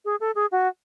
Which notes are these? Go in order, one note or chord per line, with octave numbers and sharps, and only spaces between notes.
G#4
A4
G#4
F#4